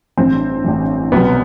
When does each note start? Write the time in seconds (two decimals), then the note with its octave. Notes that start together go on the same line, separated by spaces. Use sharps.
0.17 A1 G2 E3 C4
0.64 A1 G2 E3
1.12 C2 B2 F#3 B3